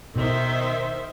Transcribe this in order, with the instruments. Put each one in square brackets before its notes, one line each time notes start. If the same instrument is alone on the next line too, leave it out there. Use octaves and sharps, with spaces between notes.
[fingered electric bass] B2 [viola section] D#3 C5 E5